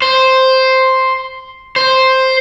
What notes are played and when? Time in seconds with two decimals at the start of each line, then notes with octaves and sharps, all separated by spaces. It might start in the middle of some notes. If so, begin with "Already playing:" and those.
0.02 C5
1.76 C5